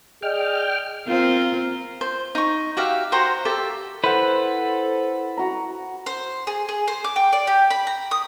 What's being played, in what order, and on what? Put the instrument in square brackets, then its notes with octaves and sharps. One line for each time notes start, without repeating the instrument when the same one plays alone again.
[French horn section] G#4 D5 D#5 [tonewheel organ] G5 F6
[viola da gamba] C4 F4 A#4
[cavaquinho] C5
D#4 C#6
F#4 G4 E5 F5
F#4 C5 G5 A#5
G4 A4 E5
[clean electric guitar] E4 B4 [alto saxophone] A4 [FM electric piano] C5 F#5
[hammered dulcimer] F#4 A#5
[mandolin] C5
G#4
G#4
C5
D6
G5
D5
G4
B5
A#5
D#6